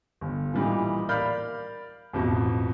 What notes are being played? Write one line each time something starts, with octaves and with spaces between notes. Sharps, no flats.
G1
A#2 E3 G3 D#4
A#4 D5 F5 B5 F6 G6
A1 F2 B2